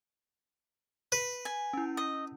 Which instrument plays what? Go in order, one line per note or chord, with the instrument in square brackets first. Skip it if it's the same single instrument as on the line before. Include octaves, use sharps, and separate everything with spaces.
[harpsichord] B4
[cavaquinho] G#5
[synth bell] C#4 E4
[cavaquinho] D#5